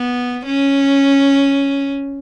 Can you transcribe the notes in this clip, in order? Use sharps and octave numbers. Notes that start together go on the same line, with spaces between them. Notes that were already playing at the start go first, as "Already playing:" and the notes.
Already playing: B3
C#4